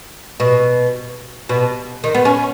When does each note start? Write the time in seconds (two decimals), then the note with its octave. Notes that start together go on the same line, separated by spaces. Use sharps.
0.40 B2
1.49 B2
2.04 D#3
2.15 B3
2.25 C#4